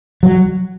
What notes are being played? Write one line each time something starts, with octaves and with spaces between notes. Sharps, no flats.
F#3